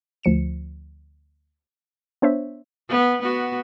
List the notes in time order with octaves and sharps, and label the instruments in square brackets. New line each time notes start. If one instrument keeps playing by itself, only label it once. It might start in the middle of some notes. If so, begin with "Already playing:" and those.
[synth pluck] D2 F3 C#7 E7
B3 D4 C5 C#5 E5
[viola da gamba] B3
B3 F#4